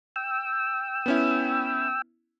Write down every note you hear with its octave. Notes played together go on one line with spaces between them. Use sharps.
G5 E6
B3 C#4 E4